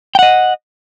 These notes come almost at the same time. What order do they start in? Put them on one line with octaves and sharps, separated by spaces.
G5 F#5 D#5